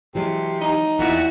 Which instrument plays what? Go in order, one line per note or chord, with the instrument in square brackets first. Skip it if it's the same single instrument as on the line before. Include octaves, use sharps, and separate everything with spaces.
[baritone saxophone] C3 [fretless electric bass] E3 F#3 G#3
[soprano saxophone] D#4
[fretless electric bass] E2 [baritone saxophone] A#2 [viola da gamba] E4 F#4